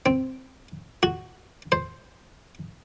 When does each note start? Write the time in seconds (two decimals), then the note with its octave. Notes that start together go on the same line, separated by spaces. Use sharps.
0.06 C4
1.03 F#4
1.72 C5